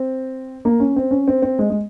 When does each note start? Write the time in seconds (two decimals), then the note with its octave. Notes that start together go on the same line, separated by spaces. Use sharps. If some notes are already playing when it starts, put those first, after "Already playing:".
Already playing: C4
0.65 A#3
0.80 C#4
0.96 C4
1.11 C#4
1.28 C4
1.42 C4
1.59 G#3
1.70 G#3